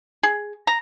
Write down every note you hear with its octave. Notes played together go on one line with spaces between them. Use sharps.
G#4
A#5